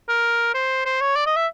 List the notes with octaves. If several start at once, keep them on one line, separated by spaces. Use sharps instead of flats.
A#4
C5
C5
C#5
D5
D#5
E5